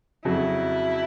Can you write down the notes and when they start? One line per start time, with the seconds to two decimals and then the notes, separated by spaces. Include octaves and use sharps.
0.25 F2 C#3 F#3 E4